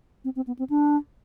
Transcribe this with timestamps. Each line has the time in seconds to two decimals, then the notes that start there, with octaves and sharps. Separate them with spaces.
0.25 C4
0.36 C4
0.47 B3
0.59 C4
0.70 D4